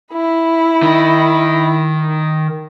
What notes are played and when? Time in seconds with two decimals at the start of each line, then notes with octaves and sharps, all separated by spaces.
0.13 E4 B5
0.83 D#3 D#4